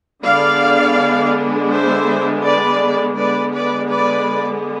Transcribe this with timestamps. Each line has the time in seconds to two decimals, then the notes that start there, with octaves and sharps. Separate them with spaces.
0.24 D3 G#3 B3 D4 D5 F5
1.71 C5 E5
2.44 B4 D5
3.16 D3 G#3 B3 B4 D5
3.53 B4 D5
3.90 B4 D5